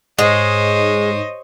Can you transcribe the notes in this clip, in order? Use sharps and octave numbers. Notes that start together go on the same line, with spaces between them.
G#2 G#3 C5 C#5 D#5